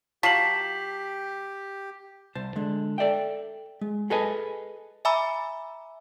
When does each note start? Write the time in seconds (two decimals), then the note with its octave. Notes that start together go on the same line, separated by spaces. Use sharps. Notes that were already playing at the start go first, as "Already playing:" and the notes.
0.23 F#3 F4 G4 A5 B6 C7 F#7
2.35 C2 C5 A5
2.56 D3 G#3
2.98 A4 D5 E5 G5
3.81 G#3
4.10 G#4 A4 B4 D#5 G#5
5.05 E5 G#5 A#5 B5 D6 E6